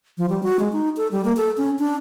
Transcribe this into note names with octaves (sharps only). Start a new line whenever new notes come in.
F3
G3
F#4
G#3
D#4
A4
G3
A#3
A4
C#4
D4